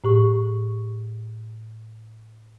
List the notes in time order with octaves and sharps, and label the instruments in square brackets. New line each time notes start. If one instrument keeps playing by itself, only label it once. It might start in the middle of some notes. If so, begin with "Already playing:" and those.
[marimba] A2 G4 C#6